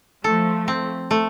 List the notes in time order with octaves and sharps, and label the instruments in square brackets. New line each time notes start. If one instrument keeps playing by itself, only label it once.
[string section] F3 A3 [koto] A4
[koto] C4
A3